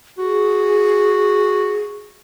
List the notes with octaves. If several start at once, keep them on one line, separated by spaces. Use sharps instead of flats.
F#4 G#4